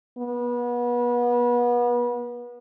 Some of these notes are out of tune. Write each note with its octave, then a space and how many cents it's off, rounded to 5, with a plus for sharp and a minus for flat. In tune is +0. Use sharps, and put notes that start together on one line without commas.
B3 -30